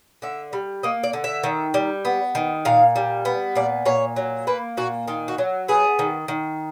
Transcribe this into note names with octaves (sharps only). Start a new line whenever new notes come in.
D3 E5
G3
A#3 D#5
D5
D3
E5
D#3
G3
B3
D#3
A#2 F5
G3
B3
A#2 D5
A#2 C#5
F#3
A#3 B4
A#2 F#4
D#3 F4
F#4
F#3
B3 G#4
D#3
D#3